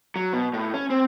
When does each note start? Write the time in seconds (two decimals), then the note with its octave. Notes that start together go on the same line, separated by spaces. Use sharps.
0.16 F#3
0.33 B2
0.54 A2
0.74 C#4
0.90 C4